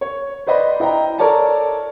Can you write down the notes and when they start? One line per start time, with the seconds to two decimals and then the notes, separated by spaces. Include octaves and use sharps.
0.01 C#5
0.47 B4 C5 D5 D#5 B5
0.80 E4 D#5 G5 A#5
1.18 A4 A#4 C#5 D5 A5 A#5